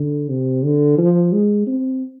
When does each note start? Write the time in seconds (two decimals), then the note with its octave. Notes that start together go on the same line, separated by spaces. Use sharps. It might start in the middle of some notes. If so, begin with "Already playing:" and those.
Already playing: D3
0.29 C3
0.63 D3
0.98 F3
1.32 G#3
1.67 C4